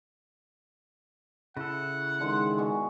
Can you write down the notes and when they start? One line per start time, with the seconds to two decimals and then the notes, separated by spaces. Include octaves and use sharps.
1.57 C#3 E4 A4 F#5
2.20 D3 D#3 G#3 C5
2.58 B2 G#4 C#6